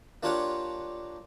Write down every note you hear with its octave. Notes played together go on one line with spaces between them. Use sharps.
A#3 D4 F4 G4 C#5 F#5